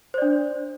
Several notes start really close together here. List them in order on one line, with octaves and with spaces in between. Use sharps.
C5 D5 D4